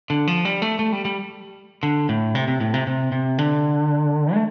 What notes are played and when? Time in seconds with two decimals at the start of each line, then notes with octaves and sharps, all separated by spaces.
0.10 D3
0.27 F3
0.45 G3
0.62 A3
0.79 A3
0.92 G3
1.05 G3
1.83 D3
2.09 A2
2.35 C3
2.48 C3
2.60 A2
2.74 C3
2.87 C3
3.12 C3
3.38 D3
4.34 A3